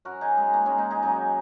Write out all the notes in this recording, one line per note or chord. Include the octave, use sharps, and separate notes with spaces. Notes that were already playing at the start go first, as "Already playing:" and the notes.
F#2 F#3 F#4 A#4
D#4 G#4
G#3
A#3
G#3 C#4
A#3 D#4
D#4 G#4
F#2 C#3 F#3 D#4 G#4